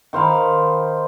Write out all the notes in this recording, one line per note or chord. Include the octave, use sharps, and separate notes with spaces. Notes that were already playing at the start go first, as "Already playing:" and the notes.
D#3 C5 F5 B5